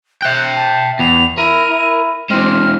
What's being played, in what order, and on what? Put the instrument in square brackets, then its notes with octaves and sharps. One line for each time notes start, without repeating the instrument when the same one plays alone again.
[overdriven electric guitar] E5 G5 [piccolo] F#6
[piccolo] A5
[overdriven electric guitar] E2 [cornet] B3 [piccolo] F7
[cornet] E4 [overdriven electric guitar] A#4 [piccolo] D#7
[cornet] E4
[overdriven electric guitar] E3 G#3 [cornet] C4 [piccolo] F6